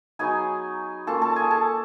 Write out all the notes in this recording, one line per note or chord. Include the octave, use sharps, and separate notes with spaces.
F#3 B3 D#4 G#4 G#5
A#3 C#4 F4 A4 A5
A4 A5
G#4 G#5
A4 A5